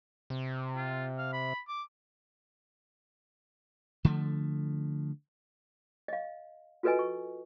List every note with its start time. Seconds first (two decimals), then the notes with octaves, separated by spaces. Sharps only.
0.30 C3
0.76 F4
1.18 F5
1.33 B5
1.68 D6
4.05 D3 F3 A3
6.08 D#5 F5
6.83 F4 F#4 A4 B4 D#5 G#5
6.99 C#6